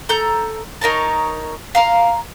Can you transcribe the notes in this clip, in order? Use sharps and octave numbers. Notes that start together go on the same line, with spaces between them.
A4 A#5 G6
D#4 A#4 C#5 A5
F5 A#5 C6